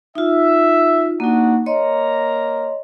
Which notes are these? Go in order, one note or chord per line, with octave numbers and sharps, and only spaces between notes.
D#4 F4 E5
A#3 D4 D#4 F#4
A#3 C#5 D#5 A#5 C6